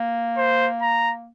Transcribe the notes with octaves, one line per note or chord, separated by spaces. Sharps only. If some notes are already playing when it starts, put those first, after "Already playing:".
Already playing: A#3
C5
A#5